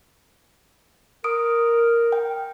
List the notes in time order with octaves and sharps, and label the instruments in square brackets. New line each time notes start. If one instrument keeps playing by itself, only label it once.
[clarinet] A#4 [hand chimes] D#6 D7
[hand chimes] G5